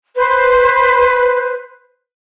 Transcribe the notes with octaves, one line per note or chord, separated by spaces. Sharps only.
B4 C5